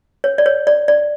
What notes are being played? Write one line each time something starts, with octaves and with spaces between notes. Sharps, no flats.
C#5
D5
C#5
D5
D5